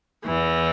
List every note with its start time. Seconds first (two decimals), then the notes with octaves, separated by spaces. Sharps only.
0.25 E2 E3